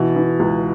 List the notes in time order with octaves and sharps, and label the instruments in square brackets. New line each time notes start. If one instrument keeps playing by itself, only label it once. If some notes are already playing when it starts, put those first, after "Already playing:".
Already playing: [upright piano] B2 E3
E3
C#2